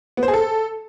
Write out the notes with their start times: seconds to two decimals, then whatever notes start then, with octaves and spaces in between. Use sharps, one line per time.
0.17 B3
0.23 C5
0.28 G#4
0.33 A4